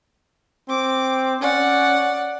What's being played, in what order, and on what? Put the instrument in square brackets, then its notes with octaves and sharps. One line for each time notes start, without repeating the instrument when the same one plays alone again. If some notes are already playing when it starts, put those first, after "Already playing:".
[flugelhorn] C4 [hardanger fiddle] D6
[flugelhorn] C#4 [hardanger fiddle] D5 F#5